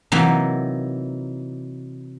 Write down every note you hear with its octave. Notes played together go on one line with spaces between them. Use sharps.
C3 E3 F#3 A#3 D#4